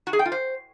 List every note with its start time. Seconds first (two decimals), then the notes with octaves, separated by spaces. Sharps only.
0.07 F#4
0.13 G#4
0.19 G5
0.26 F4
0.32 C5